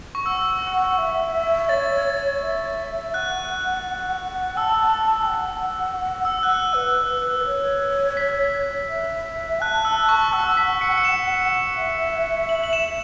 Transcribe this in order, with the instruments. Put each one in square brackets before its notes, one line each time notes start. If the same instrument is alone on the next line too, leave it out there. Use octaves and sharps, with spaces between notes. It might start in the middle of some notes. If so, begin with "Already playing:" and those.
[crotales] C#6
[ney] F#5 [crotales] E6
[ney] E5
[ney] C#5 [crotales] A6
[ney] E5
[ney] F#5 [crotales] F#6
[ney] A5 [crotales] E6
[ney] F#5
[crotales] E6
F#6
E6
[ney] B4 [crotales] E6
[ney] B4
C#5
[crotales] B6
[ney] E5
[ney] A5 [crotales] F#6
[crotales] E6
C#6
[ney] F#5 [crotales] E6
[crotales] B6
C#7
C#7
E7
[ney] E5
[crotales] F#7
F#7
E7